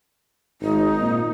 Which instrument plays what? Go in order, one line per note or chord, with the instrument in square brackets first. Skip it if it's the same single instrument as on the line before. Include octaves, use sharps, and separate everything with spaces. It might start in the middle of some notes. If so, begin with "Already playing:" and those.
[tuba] G#1 [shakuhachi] D#4
[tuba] A#2